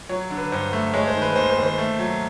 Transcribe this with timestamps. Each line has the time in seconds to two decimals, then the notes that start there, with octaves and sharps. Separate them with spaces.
0.09 F#3 C#5
0.30 D3
0.37 B4
0.52 G2 C5
0.73 A3
0.94 G#3 C#5
1.07 C5
1.15 D#3
1.22 B4
1.36 D#2 C5
1.50 C5
1.57 D#2
1.63 C5
1.78 A3
1.99 F#3